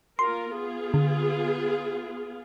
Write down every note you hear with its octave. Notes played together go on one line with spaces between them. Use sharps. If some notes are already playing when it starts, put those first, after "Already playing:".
A#3 F4 A#4 C6
B3 F4 G#4
D3